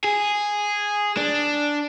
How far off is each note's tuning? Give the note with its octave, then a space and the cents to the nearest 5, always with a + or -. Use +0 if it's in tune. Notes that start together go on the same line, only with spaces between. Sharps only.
G#4 -5
D4 +0